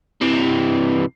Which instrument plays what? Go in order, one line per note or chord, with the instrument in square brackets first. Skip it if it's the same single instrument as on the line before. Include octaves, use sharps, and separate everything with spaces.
[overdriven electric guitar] C3 E3